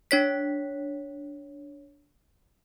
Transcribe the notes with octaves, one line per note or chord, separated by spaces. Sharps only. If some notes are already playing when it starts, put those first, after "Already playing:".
D4 C#5 B6